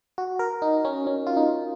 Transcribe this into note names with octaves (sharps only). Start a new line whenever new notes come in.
F#4
A#4
D#4
C#4
C#4
F4
D#4